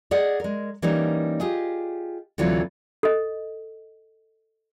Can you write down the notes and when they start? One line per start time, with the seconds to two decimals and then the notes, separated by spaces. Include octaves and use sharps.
0.11 G#4 D5 D#5 F#5
0.40 G#3 A#4
0.82 E3 G3 A#3 C#4 D#4 A#4
1.40 F4 G4 G#4 D#5
2.38 D2 C3 E3 F#3 A3 F4
3.03 A4 D#5